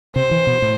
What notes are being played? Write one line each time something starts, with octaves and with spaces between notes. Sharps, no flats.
C3 C5
E3
B2
A2